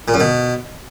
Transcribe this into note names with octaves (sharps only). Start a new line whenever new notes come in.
A#2
F#2
B2